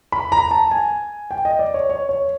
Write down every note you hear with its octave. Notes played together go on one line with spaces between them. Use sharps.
B5
A#5
A5
G#5
G5
D#5
D5
C#5
C#5
C#5